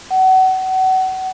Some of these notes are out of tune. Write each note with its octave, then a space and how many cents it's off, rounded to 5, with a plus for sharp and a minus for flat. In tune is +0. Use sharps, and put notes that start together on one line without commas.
F#5 +30